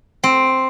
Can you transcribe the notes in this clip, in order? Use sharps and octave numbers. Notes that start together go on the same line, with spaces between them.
C4